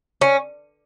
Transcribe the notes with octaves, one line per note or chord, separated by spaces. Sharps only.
C#4